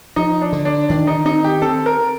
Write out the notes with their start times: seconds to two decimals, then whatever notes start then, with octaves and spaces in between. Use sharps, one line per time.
0.16 F3 D#4
0.42 D4
0.53 D3
0.65 D4
0.89 D#3 D4
1.07 D#4
1.25 C4 D#4
1.44 G4
1.62 C4 A4
1.86 A#4